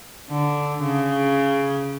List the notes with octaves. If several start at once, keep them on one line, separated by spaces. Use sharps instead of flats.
D3
C#3